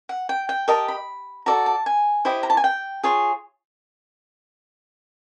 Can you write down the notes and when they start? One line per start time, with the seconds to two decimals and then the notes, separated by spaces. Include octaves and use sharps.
0.09 F#5
0.29 G5
0.49 G5
0.68 G4 A#4 D#5 A5
0.88 B5
1.46 F#4 A4 D5 A#5
1.66 A5
1.86 G#5
2.25 E4 G4 C5 D#5
2.43 A#5
2.50 A5
2.57 G#5
2.64 G5
3.03 F4 G#4 C#5